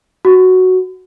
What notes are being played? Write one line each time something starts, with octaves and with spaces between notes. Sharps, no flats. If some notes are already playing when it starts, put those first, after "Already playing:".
F#4